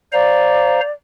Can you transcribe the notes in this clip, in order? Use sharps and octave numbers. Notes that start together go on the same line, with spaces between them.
C5 D5 F5 A#5